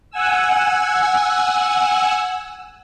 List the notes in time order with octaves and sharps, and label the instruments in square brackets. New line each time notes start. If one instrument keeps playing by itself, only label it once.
[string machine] F#5 G#5 E6